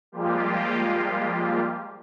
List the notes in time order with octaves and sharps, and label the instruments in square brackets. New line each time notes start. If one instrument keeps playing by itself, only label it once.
[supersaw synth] F3 G3 G#3 A#3 F4 G4